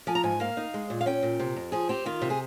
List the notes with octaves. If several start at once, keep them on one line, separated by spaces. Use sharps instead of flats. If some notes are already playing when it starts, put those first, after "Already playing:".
F3 G#5
A#5
G#2 G#5
A#3 F5
D#4
G#3
A#2
F5
C#4 G5
A#2
C3
F2
F3 G#4
C4 G4
D#3 F4
C3
G#4